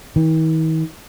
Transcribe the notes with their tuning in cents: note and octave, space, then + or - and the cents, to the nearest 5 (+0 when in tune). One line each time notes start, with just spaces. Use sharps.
D#3 +45